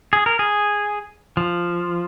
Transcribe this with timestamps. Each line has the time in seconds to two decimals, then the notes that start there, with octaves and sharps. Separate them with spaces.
0.13 G#4
0.26 A#4
0.39 G#4
1.37 F3